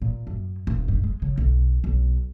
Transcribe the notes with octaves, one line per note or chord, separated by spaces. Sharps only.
A#2
F#2
D#1
G2
G#3
C#3
B1
B1